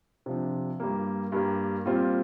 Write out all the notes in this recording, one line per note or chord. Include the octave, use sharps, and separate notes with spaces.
C3 F3 D4
G2 G3 A#3
G2 G3 A#3
A#2 G3 C4 F4